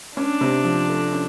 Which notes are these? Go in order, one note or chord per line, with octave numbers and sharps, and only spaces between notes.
C#4 D4
C3
F3
A3
C#4